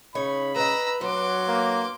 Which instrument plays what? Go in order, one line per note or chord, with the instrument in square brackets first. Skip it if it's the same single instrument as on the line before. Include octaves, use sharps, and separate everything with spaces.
[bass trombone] C#3 [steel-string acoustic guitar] D#4 C#5 [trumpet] B5
[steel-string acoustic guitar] B4 D#5 [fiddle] A#5 E6
[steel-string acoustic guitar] G2 B3 [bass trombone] F#3 [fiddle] C6 D6
[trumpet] A#3